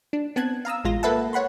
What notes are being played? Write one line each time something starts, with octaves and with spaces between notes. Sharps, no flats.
D4
B3 C4 A5 F#6 G#6
F5 A#5 D#6 E6
A1 G#3 F4 A#6
A#3 A4 B4 E5 F#5 A5
C#5 F#5 B5 C6